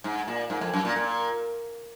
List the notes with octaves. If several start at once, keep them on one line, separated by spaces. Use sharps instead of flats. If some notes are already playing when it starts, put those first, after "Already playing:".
G#2
A#2
G#2
F2
F#2
A#2
A#2